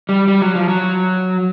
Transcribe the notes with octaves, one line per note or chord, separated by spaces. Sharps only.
G3
G3
F#3
F3
F#3